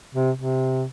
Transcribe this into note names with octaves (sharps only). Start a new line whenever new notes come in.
C3
C3